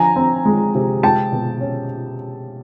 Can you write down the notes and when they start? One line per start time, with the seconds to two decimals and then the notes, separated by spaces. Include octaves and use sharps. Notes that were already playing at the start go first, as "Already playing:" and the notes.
Already playing: D3 F3 G#5 A#5
0.16 C4
0.45 G#3
0.75 C3
1.03 G#3 G5 A5
1.32 B2
1.61 C#4